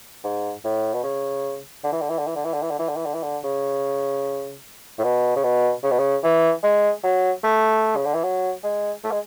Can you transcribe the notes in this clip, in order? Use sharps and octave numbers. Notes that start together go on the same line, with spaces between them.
G#2
A2
B2
C#3
D3
E3
D3
E3
D3
E3
D3
E3
D3
E3
D3
E3
D3
E3
D3
E3
D3
C#3
A2
B2
C#3
B2
C#3
B2
C#3
E3
G#3
F#3
A3
C#3
D3
E3
F#3
G#3
A3
G#3